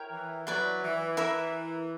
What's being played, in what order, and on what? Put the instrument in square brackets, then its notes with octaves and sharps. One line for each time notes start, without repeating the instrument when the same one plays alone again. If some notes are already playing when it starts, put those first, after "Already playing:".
Already playing: [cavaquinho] E4 A#4 C#5 G5
[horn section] E3
[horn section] F#3 [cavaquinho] E4 B4 D5
[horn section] E3
[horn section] E3 [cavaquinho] E4 A#4 E5 B5